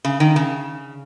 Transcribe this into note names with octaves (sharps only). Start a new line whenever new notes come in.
C#3
D#3
C#3